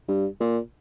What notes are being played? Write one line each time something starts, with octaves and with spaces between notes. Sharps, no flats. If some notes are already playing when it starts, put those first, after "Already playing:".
G2
A#2